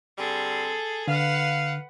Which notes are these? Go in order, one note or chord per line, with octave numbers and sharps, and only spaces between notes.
D3 G3 C4 G#4 A4
D3 B4 F5 F#5